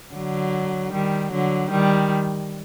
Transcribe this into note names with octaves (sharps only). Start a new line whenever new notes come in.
D3 F#3
D#3 G3
D3 F#3
D#3 G3